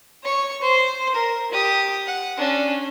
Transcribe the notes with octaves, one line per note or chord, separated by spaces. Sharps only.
C#5 C#6
C5
A#4
G4 D#6
F#5
C#4 D4